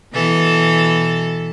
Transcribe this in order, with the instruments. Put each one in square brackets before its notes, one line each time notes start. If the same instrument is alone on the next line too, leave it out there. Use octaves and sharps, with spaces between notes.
[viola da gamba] B2 E3 A4